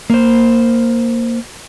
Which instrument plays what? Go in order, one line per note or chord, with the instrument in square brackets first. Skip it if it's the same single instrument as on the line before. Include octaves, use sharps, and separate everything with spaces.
[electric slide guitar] A#3 C5